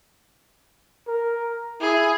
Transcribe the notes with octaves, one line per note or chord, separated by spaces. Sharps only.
A#4
E4 G#4